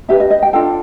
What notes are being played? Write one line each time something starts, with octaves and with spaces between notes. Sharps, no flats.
D4 G4 B4 E5
D#5
D#5
G5
D4 F4 A4 G5